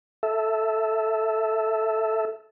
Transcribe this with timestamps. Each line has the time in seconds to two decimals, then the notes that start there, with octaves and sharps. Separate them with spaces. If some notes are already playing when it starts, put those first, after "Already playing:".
0.23 A4 E5